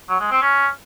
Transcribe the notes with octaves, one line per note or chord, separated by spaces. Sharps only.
F#3
G#3
C4
C#4